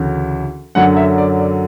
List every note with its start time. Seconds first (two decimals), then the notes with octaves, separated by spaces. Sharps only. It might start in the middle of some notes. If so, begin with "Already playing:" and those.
Already playing: D2 C#3 E3
0.75 F#2 D3 F#3 F#5
0.97 E5
1.18 D5
1.39 D5